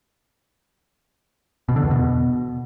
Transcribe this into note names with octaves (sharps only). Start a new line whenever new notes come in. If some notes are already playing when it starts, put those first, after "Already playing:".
B2
D3
E2
B2